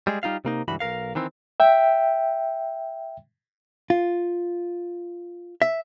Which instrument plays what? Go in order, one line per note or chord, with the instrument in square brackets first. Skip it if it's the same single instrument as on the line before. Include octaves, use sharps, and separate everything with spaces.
[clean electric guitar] G3 G#3 G#4
G3 D#4 F4 F5
C3 A#3 D#4
C#2 G2 E3 F#4 B5
B1 A#2 A#4 F5
D#3 E3 C4
[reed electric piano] E5 G5
[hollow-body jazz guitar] F4
E5